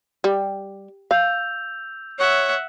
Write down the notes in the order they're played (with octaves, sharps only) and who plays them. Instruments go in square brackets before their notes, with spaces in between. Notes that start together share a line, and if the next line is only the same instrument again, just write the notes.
[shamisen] G3
[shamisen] F5 [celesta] E6 G6 F7
[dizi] C#5 [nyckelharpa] E5 F#5